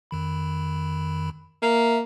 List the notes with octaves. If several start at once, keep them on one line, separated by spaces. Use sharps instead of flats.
F2 D#3 B5
A#3 E5